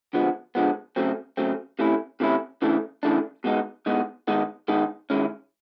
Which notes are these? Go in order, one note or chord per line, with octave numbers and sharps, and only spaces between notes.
D3 F3 G#3 B3
D3 F3 G#3 B3
C#3 F#3 A3 C4
C#3 F#3 A3 C4
C3 E3 A3 C#4 E4
C3 E3 A3 C#4 E4
C#3 E3 A3 D4
C#3 E3 A3 D4
B2 G#3 B3 D#4
B2 G#3 B3 D#4
D#3 G#3 B3 D#4
D#3 G#3 B3 D#4
D#3 G#3 C#4 E4